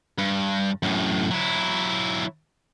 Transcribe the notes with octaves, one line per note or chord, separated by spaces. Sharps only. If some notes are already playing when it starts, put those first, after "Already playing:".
G2
F#2 A2
F#3 E4